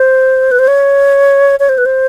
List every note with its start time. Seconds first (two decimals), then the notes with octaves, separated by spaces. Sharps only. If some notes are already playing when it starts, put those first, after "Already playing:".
Already playing: C5
0.51 B4
0.59 C5
0.68 C#5
1.60 C#5
1.69 C5
1.78 B4
1.86 C5